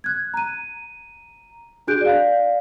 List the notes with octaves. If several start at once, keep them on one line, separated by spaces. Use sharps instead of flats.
F#6 G#6
A#5 D#7
D4 F#4 G#4 F#6 G6 D7
D5 F5